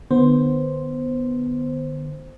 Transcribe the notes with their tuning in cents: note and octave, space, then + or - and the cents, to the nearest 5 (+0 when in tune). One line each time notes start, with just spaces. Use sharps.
D3 +35 B3 +0 C5 +0